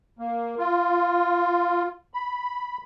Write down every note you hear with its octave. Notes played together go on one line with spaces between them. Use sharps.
A#3
F4
B5